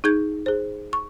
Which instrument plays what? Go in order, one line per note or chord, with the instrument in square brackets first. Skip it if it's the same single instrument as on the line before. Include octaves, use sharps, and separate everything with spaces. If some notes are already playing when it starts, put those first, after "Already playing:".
[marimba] D#4 G#4 G6 G#6
G#4 C5
C#6